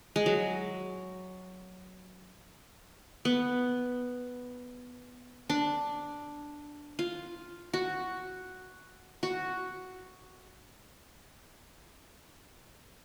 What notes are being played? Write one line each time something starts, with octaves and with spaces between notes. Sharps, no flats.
G#3
F#3
B3
D4
F4
F#4
F#4